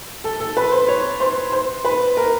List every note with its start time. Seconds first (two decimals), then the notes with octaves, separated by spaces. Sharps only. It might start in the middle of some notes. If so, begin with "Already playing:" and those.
0.24 A4
0.40 A4
0.57 B4
0.72 C5
0.88 C#5
1.20 C5
1.52 C5
1.85 B4
2.17 A#4